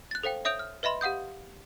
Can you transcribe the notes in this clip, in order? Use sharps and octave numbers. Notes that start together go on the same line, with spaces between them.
F#6 A6
A4 C5 F5 G5
C#5 E5 D#6 G6 D7 F7
F6
B4 D#5 E5 B5 C6
G4 F5 F#5 D#6 G6